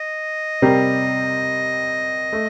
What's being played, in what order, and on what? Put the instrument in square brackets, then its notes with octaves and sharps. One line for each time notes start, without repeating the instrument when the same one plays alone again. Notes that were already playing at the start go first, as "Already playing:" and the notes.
Already playing: [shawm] D#5
[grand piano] C3 G3 C4 G4 A#4
A3